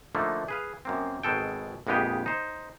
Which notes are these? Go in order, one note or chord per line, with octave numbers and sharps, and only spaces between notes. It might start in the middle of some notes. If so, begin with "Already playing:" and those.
D3 F3 A3 A#3 D#4
G#4 B4 F5
F#2 A#3 C4
G#1 B2 G#3 A4 G5
A#1 F2 G#3 B3 G4 D#5
D#4 C5